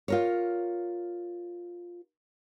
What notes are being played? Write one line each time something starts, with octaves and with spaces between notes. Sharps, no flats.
F4 A#4 C#5